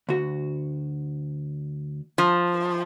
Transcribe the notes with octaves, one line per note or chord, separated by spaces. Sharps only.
D2 F#4
F3